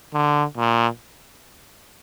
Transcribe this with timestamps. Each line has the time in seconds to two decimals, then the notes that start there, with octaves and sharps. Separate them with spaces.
0.14 D3
0.57 A#2